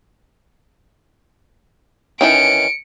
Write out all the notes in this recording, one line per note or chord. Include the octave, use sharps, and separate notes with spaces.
D#3 E3 C#4 C#7 D7